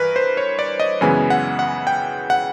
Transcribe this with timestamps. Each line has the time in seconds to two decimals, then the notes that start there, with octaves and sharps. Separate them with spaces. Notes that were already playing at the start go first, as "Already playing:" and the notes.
Already playing: G2 E3 A#4 B4
0.16 C5
0.37 C#5
0.59 D5
0.80 D#5
1.01 F#2 C#3 E3 G#3 B3 G#5
1.30 F#5
1.59 F#5
1.87 G5
2.30 F#5